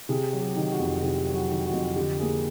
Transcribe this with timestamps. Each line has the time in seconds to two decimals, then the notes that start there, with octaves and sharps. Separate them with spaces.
0.09 C3 G#4
0.33 F#3
0.41 G4
0.56 D#3
0.71 F#4
0.79 F2
1.02 C3 G4
1.27 F#3
1.35 F#4
1.50 D#3
1.66 F#4
1.73 F2
1.96 D3 G4
2.19 A#3 G#4